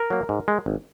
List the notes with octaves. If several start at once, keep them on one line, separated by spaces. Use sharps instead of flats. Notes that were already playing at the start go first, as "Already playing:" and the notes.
Already playing: A#4
F#3 A#3
G#2
G#3
G#1